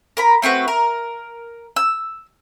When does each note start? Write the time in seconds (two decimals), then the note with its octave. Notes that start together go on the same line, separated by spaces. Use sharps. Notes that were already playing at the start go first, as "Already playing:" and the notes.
0.17 A#4 A#5 B5
0.42 A3 C4 F#4 B4
0.68 A#4
1.76 E6